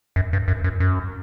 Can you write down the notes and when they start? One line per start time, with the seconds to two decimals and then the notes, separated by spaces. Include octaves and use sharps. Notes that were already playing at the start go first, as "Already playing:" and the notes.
0.16 F#2
0.33 G2
0.48 F#2
0.64 F#2
0.80 F#2